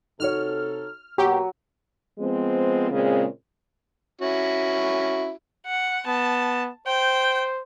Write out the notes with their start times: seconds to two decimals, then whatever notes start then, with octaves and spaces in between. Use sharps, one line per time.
0.20 C3 D#4 F#4 A4 C#5 F6
1.18 B2 F#3 A#3 G4 C#6
2.19 F3 G#3 B3 C4
2.91 A#2 C#3 G#3 C4
4.21 C#4 E4 F#4
5.66 F#5
6.07 B3 A5
6.87 C5 G5